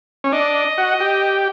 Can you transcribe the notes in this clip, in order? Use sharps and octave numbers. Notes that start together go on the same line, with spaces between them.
C#4
D4 D#5
F#4
G4